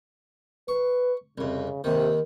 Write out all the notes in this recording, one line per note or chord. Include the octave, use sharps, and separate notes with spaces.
B4 C#6
C2 F2 C#3
D#2 C3 D#3